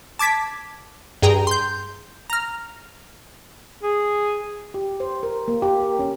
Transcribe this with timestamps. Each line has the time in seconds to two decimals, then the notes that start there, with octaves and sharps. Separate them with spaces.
0.19 A5 D6 G#6 B6
1.22 G2 G#4 G5 A#5
1.47 C6 G6
2.30 A#5 F6
3.83 G#4
4.74 G4
5.00 C5
5.23 A#4
5.48 A#3
5.62 G4
5.81 A#4
5.99 C#4